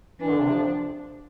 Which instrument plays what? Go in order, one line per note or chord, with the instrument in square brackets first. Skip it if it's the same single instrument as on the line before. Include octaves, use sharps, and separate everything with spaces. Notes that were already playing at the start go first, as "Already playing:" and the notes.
[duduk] E3 [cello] D4
[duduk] D3
C3
F3